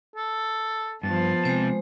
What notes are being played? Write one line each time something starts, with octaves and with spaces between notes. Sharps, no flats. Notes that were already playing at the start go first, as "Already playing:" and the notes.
A4
G2 F3 B3 A5
C3 G#3 C5